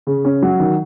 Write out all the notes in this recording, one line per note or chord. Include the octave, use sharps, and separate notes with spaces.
C#3
C#4
F#3
D#3